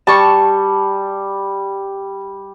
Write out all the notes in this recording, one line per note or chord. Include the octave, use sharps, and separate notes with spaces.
G3 A5 C#6